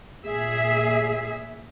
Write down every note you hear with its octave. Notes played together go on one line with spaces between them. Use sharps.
A#2 G#4 E5